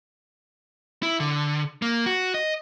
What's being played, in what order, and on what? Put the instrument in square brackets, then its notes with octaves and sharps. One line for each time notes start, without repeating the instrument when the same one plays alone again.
[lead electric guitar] E4
D3
A#3
F#4
D#5